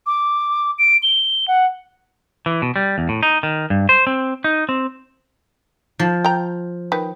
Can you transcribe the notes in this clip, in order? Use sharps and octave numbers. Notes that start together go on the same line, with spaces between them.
D6
D7
G7
F#5
E3
B2
G3
E2
A2
D#4
D#3
G2
C5
C4
D#4
C4
F3
G5 A#5
D#3 B4